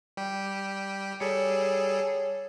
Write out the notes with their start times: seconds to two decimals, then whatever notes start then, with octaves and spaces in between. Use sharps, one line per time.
0.17 G3 G4
1.20 G3 G#4 A4 C#5